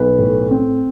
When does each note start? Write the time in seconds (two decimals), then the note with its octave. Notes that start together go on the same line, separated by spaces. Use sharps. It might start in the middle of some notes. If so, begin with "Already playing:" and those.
Already playing: B1 B4
0.18 A2
0.51 C4